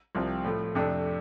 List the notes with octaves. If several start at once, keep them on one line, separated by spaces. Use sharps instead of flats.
C2 C3 F3 C4
A2 F3 A3
F2 C3 A3 D4